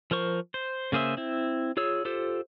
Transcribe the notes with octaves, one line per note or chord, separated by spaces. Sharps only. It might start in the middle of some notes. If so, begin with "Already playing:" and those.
F3 A#4 C5 C#6
C5
C#3 A#3 G#4 C5 E5
C4 E4
F4 G#4 C#5 E6
F4 G4 A4 C5